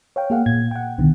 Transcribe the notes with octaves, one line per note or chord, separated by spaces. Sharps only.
C#5 F5 G5
A#3 G#4 F5 F#5
A#2 G#6
F#5 G5
C2 B2 D3 D#3